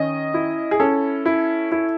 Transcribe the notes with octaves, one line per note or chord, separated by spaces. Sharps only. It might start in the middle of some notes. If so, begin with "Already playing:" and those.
Already playing: D#3 C#4 D#5
E4
G#4
C#4 A4
E4
E4